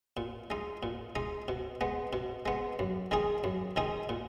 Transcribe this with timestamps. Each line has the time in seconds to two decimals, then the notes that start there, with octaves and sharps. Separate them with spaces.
0.17 A#2
0.50 G#3 D#4
0.83 A#2
1.16 G#3 D#4
1.48 B2
1.81 G#3 B3
2.13 B2
2.46 G#3 B3
2.79 F#2
3.11 D#3 G#3 D#4 G#4
3.44 F#2
3.76 D#3 G#3 D#4 G#4
4.09 A#2